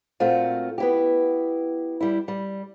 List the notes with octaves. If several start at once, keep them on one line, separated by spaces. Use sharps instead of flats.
A#2 A3 C4 F4 F#4
B3 E4 G4
G3 E4
G3